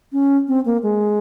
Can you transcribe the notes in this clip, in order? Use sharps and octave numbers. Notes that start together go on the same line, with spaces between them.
C#4
C4
A#3
G#3